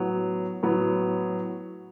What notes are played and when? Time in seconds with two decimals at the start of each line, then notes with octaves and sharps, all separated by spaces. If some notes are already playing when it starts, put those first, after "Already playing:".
Already playing: A2 F#3 B3
0.63 A2 F#3 B3